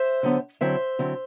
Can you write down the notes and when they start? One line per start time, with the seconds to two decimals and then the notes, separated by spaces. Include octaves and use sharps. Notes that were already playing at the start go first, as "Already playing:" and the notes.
Already playing: C5 E5
0.23 D3 F#3 B3
0.61 D3 F#3 C4 E4 C5 E5
0.99 D3 F#3 C4 E4